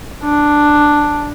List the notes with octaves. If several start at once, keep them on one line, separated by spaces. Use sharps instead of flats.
D4